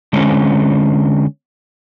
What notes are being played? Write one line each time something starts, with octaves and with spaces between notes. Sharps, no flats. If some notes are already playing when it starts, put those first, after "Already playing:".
D3 G#3 C4 C#4